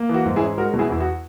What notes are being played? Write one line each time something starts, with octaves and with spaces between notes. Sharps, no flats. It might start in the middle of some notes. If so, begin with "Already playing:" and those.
Already playing: A#3
E3
F#4
G#2
E4 G#4
C#4
G#3 F#4 A#4
B2
E4 G#4
E2 E4
F#4